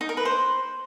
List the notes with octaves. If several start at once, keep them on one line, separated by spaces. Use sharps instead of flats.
D#4
A#4
B4
C5